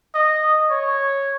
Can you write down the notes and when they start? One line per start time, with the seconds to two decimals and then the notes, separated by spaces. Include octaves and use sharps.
0.14 D#5
0.70 C#5